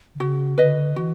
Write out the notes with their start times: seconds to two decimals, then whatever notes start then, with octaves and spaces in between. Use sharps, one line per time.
0.15 D3
0.20 C#3 F#4
0.58 D3 B4 D#5
0.96 E3 F#4